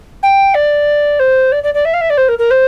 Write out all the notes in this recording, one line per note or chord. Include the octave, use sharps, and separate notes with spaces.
G5
D5
C5
D5
D5
D5
E5
F5
E5
D5
C5
A#4
A#4
C5